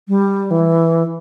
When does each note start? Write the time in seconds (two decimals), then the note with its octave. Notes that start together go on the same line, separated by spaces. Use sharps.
0.08 G3
0.51 E3